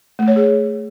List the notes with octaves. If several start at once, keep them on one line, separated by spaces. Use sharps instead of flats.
A3
C#5
G#4